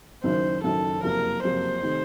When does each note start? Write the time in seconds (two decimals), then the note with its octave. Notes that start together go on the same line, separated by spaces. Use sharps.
0.24 F#1 F#2 D#3 C5
0.64 F#1 F#2 D#3 A4
1.03 F#1 F2 C3 F#3 A#3 A#4
1.43 F#1 F2 C3 F#3 A#3 C5
1.83 C3 D#3 A3